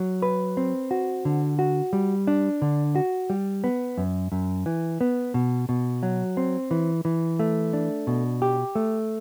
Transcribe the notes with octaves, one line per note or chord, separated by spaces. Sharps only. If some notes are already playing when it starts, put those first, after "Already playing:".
Already playing: F#3
B4
C4
F#4
D3
F#4
G3
D4
D3
F#4
G3
B3
F#2
F#2
E3
B3
B2
B2
F#3
C4
E3
E3
A3
D4
B2
G4
A3